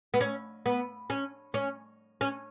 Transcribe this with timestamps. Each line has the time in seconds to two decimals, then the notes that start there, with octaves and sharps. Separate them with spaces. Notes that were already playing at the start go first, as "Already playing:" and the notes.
0.14 B3
0.21 C#4
0.66 B3
1.10 C#4
1.54 C#4
2.21 C#4